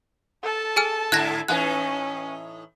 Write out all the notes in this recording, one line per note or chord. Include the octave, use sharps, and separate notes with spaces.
A4 A5
G#4 G#5 F6
G#2 D3 E4 F#6 G#6 A#6
A2 E3 C#4 D#4 F#6